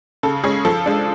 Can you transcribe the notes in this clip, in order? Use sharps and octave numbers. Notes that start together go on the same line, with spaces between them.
C#3 A4
G#3 C#4 G#4
F3 A4
G#3 D4